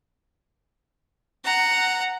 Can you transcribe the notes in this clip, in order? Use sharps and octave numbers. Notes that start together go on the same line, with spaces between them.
F#5 A#5